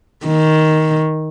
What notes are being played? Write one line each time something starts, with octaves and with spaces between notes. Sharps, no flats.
D#3